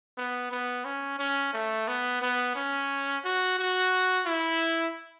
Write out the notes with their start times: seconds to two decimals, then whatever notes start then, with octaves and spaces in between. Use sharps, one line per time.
0.18 B3
0.52 B3
0.85 C#4
1.19 C#4
1.54 A3
1.88 B3
2.21 B3
2.56 C#4
3.25 F#4
3.59 F#4
4.26 E4